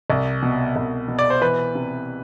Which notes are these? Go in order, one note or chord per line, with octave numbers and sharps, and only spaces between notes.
C2
B2
C2
B2
D5
C5
E3 B4
C3